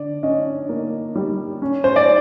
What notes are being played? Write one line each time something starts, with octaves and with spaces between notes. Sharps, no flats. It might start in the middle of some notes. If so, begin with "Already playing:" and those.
Already playing: D3 D5
C#4 D#5
A#3
G3
C#4
C5
D5